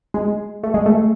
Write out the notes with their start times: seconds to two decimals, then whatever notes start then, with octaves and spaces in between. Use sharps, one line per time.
0.14 G#3
0.63 A3
0.74 G#3
0.86 A3